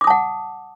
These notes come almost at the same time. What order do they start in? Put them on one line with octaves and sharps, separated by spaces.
D6 D#6 A5 F#5